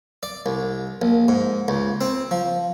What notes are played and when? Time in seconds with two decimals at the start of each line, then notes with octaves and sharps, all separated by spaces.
0.23 D5
0.46 C2
1.02 A#1
1.28 G#2
1.68 C#2
2.01 C4
2.31 F3